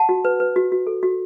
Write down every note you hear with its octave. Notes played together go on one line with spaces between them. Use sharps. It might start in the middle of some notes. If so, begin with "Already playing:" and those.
Already playing: F#5 A5
F#4
B4
B4
F#4
F#4
A4
F#4